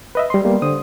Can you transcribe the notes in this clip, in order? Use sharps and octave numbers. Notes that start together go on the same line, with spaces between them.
B4 D#5 E5
G3 C6
G3 A#3 B3
D3 C5 D#6